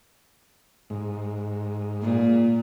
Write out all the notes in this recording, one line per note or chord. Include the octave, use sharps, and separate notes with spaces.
G#2
A#2